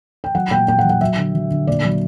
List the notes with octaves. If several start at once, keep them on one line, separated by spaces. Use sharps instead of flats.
G5
F#3 F#5
A#2 G5
A#2 G5
F#5
F#3
F#5
F#3 E5
D3
F#3
D3
A#2 D5
F#3